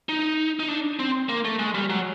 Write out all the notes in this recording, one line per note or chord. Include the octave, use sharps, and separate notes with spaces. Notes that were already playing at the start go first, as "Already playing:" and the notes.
D#4
D#4
D4
C4
A#3
A3
G#3
G3
F#3